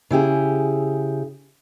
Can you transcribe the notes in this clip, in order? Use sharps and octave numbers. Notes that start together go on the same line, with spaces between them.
C#3 E4 G4 G#4